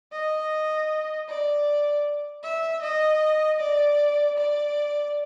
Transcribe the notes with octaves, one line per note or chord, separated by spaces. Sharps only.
D#5
D5
E5
D#5
D5
D5